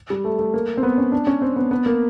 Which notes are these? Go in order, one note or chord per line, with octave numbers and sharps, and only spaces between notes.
G3
A3
A3
A#3
C4
B3
C#4
D4
C#4
C4
B3
B3
A#3